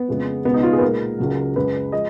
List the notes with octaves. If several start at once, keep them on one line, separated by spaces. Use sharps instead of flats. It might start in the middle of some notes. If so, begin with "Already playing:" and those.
Already playing: B3
F2 C#3 G#3
C#2 B2 G#3 B3
D#4
F4
G#4
B4
A#2 G#3 A#4
C#2 C#3 F#3
F#2 C#3 G#3 B4
F3 G#3 D#5